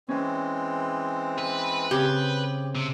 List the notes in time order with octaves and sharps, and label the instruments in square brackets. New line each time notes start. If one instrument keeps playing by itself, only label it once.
[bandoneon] E3 G#3 C4 [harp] C#4
[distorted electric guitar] B4
[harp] C#3 C4 G#4 [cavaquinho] G4
[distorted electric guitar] C3